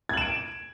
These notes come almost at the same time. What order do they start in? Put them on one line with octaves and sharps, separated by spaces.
G#6 F#7 E7 D7